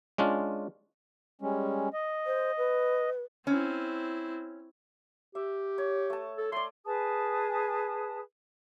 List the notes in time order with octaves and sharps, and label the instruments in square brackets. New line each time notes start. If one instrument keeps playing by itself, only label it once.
[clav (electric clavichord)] G#3 C#4 D4 F4
[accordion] G3 G#3 C#4
D#5
[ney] C5
B4
[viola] C4 E4 [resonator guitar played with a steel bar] C#4
[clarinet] G4 [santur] E5
[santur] C#5
A3 A5
[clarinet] A4
[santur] A3 D5 [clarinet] C6
[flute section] G#4 B4 A5 D#6